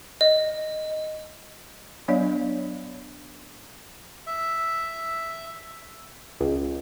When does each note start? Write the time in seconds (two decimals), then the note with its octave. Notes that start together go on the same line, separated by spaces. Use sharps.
0.21 D#5
2.08 F#3 B3 D4 C#5 D5 F5
4.27 E5
6.40 C#2